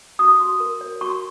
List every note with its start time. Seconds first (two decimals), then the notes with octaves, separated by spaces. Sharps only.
0.19 F#4 D#6
0.40 F#4
0.60 A#4
0.81 C#5
1.01 F#4 C#6